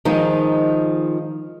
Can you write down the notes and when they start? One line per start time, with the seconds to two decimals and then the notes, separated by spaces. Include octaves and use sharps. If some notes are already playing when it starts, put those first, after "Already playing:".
0.05 D#3 F3 G#3 D#4